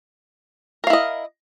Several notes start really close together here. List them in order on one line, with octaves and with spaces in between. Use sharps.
A#4 F5 E4 D#5